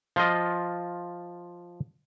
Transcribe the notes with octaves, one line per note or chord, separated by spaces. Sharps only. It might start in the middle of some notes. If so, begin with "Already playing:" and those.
F3 F4 D#5